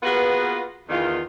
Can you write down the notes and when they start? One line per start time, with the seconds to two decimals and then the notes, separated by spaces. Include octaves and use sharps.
0.03 A#3 B3 F4 F#4 G#4 B4
0.90 E2 D#3 F4